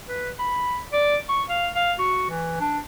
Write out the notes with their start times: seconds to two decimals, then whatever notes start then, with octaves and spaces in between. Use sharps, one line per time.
0.08 B4
0.39 B5
0.93 D5
1.29 C#6
1.49 F5
1.75 F5
1.99 F#4
2.30 E3
2.61 D4